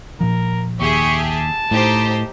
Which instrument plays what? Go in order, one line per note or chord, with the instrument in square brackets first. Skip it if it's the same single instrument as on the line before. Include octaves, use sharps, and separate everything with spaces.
[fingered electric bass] A#2 F3 [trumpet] A#4
[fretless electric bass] D#2 [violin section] G4 G#4 E5 [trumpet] C#6
[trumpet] A5
[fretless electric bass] A2 [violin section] D#4 G4 C5